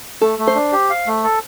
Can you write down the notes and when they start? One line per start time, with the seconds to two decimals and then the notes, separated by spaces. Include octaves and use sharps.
0.21 A3 A4
0.39 A3
0.47 C5
0.55 D4
0.72 G4
0.90 F5
1.07 A3
1.24 A4